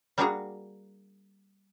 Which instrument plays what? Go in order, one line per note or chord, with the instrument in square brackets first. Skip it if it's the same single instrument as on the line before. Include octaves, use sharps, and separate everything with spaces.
[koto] G3 A#3 D4 F#4 G#4 A#5